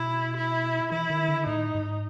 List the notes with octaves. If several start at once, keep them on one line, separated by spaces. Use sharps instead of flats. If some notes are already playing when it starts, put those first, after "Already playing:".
Already playing: B2 E4
E4
E3 E4
D#3
D3
A2 D#4
G#2